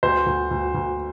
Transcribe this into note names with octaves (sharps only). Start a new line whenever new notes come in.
D2 C5
D2
D2
D2